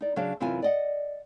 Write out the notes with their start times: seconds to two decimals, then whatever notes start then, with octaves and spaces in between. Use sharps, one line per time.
0.01 D#4 D5
0.16 C#3 F#3 D4 C#5 F5
0.40 F#2 C3 E3 F4 B4 G#5
0.62 D5 D#5 F#5